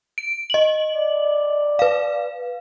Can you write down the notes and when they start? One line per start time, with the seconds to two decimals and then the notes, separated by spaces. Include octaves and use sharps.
0.18 D7
0.50 D#5 F#7
0.93 D5
1.79 B4 F5